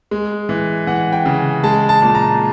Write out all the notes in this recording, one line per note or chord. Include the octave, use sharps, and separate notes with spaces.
G#3
E3
E3 F#5
G5
C#3
G#3 A5
A5
A#2
A#5